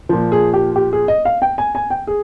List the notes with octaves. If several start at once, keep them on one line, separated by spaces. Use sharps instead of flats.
A#2 F3
G#4
G4
G4
G#4
D#5
F5
G5
G#5
G#5
G5
G#4